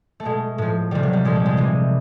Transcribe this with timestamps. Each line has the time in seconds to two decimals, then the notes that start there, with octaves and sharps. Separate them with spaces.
0.20 A3
0.25 B2 G#3
0.58 A2 F3
0.91 C3 D#3 G3
1.03 F#3
1.13 G3
1.25 A#2 F3 G#3
1.35 G3
1.46 G#3
1.57 C3 E3